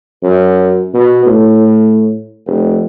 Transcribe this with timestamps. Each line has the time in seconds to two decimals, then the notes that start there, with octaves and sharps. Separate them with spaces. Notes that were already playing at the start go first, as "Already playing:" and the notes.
0.23 F#2
0.94 B2
1.26 A2
2.46 F1